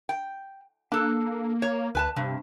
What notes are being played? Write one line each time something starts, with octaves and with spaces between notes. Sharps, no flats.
G5
A#3 D4 A4
C#5
D2 B4 G#5 A5
G2 C3